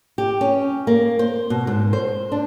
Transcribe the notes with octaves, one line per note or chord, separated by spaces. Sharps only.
G4
C#4
A#3
C5
B2
G#2
C5
D4